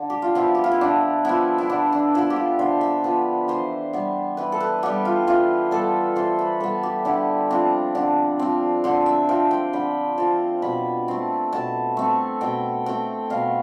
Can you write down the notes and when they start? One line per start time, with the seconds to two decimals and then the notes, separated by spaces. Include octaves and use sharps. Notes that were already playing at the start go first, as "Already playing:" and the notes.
Already playing: D3
0.10 G4
0.22 F4
0.35 F3 B3 E4
0.55 G4
0.64 F4
0.72 E4
0.81 D3 D4
1.25 F3 B3 E4
1.58 E4
1.70 D3 D4
1.92 D4
2.14 F3 B3 E4
2.30 G4
2.36 F4
2.59 D3 C5
2.81 E5
3.04 F3 B3 B4
3.48 E3 C5
3.93 G3 B3
4.37 E3 B4
4.52 A4
4.60 B4
4.83 G3 B3 G4
5.05 F4
5.27 E3 F4
5.71 G3 B3 A4
6.16 E3 C5
6.39 B4
6.60 G3 B3 A4
6.83 G4
7.05 D3 E4
7.50 F3 C4 D4
7.95 D3 D4
8.39 F3 C4
8.84 D3 C5
9.06 E5
9.29 F3 C4 G5
9.51 G5
9.73 D3 B5
10.18 F3 C4 A5
10.62 B2 B5
11.08 A3 C4
11.53 B2 A5
11.97 A3 C4
12.41 B2 G5
12.86 A3 C4 G5
13.30 B2 F5